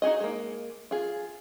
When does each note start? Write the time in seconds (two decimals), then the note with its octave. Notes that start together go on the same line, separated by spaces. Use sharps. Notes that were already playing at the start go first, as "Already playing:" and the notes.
0.02 D#4 F#4 G#4 D#5
0.20 G#3 A#3
0.91 F4 G#4